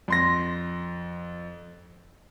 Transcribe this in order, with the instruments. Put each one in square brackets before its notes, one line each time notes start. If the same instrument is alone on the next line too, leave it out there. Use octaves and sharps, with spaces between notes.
[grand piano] F2 C6 A#6